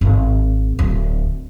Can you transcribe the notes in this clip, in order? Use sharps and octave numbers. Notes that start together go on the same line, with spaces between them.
G#1
D1